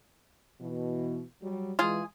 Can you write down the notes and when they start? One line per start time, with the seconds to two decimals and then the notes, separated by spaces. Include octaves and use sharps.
0.59 B2 E3
1.42 F#3 G3
1.79 E3 G#3 F4 G#4